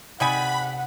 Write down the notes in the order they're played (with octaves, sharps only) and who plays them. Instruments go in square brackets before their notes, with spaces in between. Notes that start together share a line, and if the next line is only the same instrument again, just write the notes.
[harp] C3 A6 [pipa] G3 D#4 G#5 [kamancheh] F#5 [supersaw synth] B5